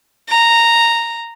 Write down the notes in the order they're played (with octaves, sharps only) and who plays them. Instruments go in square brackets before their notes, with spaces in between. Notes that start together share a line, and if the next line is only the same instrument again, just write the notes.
[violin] A#5